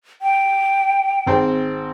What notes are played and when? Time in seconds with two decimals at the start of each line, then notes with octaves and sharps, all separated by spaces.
0.22 G5
1.27 G#1 C4 C5